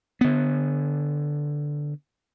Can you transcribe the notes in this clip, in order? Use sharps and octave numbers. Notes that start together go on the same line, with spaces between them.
D3 B3